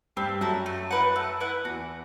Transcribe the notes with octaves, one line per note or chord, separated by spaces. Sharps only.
G2 G3 C4
F#2 F#3 E4 A4
A3
E4 B4 F#5
A3
E4 B4 F#5
E2 E3 F#4